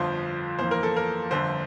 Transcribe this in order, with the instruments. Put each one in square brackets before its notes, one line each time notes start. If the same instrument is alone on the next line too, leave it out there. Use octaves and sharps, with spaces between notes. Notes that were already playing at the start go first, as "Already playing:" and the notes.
Already playing: [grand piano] G1 F2 D3 F3 C5
G1 F2 E3 A#3 C5
A#4
A4
A#4
G1 F2 D3 C5